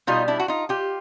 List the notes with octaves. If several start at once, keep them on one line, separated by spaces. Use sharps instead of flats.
B2 G3 D#4 F4
D4 E4
F#4
D#4 F4
F4 G4